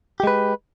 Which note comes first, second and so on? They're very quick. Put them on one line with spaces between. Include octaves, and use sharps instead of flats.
G4 G#3 B4